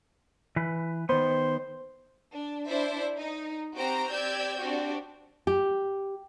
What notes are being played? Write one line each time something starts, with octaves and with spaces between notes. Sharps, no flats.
E3 B4
D#3 B3 C5
D4
D4 E4 C5 D5 E5
D#4
C4 F#4 G4 C5 A#5 D7
C4 G4 D5 E6 G6 G#6
C4 D4 F#4 G4
G4